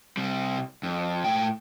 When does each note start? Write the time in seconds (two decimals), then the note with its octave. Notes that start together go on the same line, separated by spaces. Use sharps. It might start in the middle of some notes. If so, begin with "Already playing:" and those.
0.17 C3 G3
0.83 F2
1.24 A2 G5